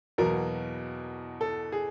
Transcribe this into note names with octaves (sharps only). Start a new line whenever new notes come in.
E2 B2 F#3 A#3 A#4
A4
G#4